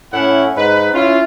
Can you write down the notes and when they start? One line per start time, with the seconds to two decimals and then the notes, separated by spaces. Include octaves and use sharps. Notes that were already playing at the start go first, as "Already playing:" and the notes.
0.13 A2 C#4 E4 F#5
0.57 G#2 D#4 B4
0.92 C#4 E4 F4